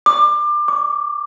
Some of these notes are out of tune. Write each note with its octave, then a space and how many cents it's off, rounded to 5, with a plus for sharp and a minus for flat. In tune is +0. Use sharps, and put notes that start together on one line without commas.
D6 +25
D6 -25